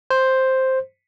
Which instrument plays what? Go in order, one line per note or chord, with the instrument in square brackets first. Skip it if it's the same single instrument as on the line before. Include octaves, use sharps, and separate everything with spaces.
[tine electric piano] C5